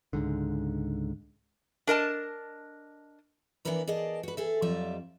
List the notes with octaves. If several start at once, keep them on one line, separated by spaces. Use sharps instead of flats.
C#2 G#2 D3
D4 A#4 D#5 A5
E3 B3 D4 A#4 B4 A#5
G#4 A#4 D5 D#5 A5
F#4 B4
G#4 A4 E5
F2 F#3 G3 F4 D5 E5